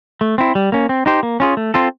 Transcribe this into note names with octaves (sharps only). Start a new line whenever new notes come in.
A3
C4 E4
G3
A#3 C#4
C4
D#4 G4 C5
A#3
C#4 F4 G#4
A3
C4 F4 A4